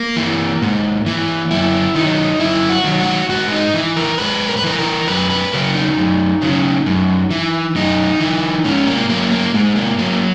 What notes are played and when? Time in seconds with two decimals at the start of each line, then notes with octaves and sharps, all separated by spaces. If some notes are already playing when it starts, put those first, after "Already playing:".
Already playing: A#3
0.16 E3
0.62 G#2
1.06 E3
1.50 F#2 E4
1.95 D#3 F#3 D#4
2.39 F#2 E4
2.69 F#4
2.84 D#3 F#3
3.00 F#4
3.29 G#2 F#4
3.52 D#4
3.74 E3
3.96 A#4
4.18 G#2 B4
4.48 A#4
4.57 B4
4.64 E3 A#4
4.79 A#4
5.07 F#2 B4
5.30 B4
5.52 C#3 F#3 A#4
5.75 D#4
5.97 F#2
6.42 C#3 F#3
6.86 F#2
7.30 E3
7.75 F#2 D#4
8.20 E3
8.64 G#2 C#4
8.87 A#3
9.09 F#3 A#3
9.32 A#3
9.54 G#2 G#3
9.76 A#3
9.98 F#3 A#3